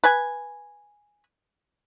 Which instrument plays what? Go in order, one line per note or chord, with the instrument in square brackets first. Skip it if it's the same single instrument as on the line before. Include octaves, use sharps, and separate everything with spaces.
[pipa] B4 G#5